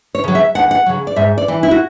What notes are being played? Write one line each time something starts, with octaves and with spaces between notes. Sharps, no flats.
C#5
C#3 F#3
E5
D2 F#5
F#5
C#3 F#3
D5
G#2 E5
D5
E3
E4
F#4